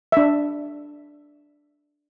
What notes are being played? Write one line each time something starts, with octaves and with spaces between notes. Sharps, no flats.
D4 E5